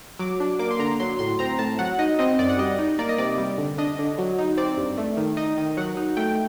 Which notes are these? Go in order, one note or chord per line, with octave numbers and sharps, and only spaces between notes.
F#3 D6
D4
A#3 D6
C6
D3 A#5
F#3 C6
A2 C6
C4 A#5
A2 A5
F#3 F#5
D#4 D#5
C4 D#5
F#2 D5
F#5
G3 D#5
D#4
A#3 D5
D#5
C3 D5
G3
D3
D4 D#5
D3
F#3
D#4
C4 D5
G2
A3
D#3
D#4 D#5
D#3
F#3 F#5
D#4
A3 G5